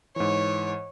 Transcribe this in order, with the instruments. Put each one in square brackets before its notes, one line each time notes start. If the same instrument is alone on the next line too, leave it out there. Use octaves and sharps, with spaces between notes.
[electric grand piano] G#2 E3 [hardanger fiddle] C#5